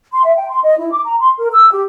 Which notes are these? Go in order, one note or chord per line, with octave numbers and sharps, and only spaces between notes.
C6
E5
G5
C6
D#5
E4
D6
A#5
C6
A#4
E6
G4